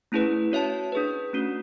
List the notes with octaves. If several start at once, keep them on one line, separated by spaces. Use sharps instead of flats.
A3 C#4 E4 G#4 B4
C#4 F#4 C#5 E5 A5
D4 G#4 B4
A3 C#4 F#4